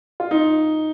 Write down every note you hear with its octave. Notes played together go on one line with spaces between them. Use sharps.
F4
D#4